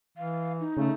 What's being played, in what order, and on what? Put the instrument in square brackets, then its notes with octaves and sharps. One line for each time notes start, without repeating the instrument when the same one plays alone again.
[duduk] E3 [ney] F5
[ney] D#4
[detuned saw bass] C#3 [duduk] A3